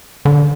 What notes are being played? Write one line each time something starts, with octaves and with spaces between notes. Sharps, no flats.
D3